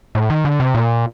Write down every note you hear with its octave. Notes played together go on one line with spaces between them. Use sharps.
A2
D#3
D3
C3
A#2